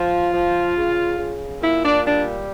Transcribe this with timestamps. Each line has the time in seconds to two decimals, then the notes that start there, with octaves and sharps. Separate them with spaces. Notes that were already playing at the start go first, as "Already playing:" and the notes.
Already playing: F3 F4
0.34 F3
0.76 C#3
1.19 C#3
1.62 A#2 E4
1.83 D4
2.05 G3 D4